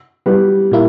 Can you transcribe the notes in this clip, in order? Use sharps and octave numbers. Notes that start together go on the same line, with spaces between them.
G3 B3
A#2 A#3 E4